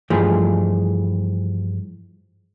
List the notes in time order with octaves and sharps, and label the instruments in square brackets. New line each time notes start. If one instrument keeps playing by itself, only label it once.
[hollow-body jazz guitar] G2 E3 F3 G#3 A3